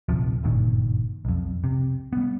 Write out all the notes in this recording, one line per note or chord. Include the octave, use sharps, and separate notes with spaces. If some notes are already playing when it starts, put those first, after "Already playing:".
A#1 D#2 C3 F3
F#1 G2 A#2 D#3
B1 F2
C3
G3 B3